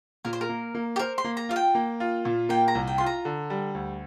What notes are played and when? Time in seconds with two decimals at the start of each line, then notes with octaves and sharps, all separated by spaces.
0.25 A#2 A#4
0.33 C5
0.41 A#4
0.49 A#3
0.75 A#3
0.96 G4
0.99 A#4 C5
1.18 C6
1.24 A#3
1.37 A#5
1.49 F4 F5
1.56 G5
1.75 A#3
2.00 F4
2.25 A#2
2.49 A#3 G5
2.68 A#5
2.75 C2
2.87 G5
2.98 F4 C6
3.06 A#5
3.25 D3
3.50 G3
3.74 D2